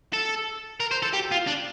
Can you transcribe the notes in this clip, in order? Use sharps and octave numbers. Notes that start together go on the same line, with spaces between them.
A4
A#4
C5
A4
G4
F4
D4